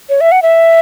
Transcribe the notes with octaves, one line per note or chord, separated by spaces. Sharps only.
C#5
E5
F#5
E5